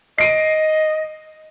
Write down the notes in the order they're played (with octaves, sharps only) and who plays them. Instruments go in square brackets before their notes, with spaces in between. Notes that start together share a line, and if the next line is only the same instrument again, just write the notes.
[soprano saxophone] D#5 [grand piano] C7 D7 D#7